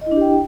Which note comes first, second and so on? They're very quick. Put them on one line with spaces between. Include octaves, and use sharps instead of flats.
D#5 E4 D4 G4 G5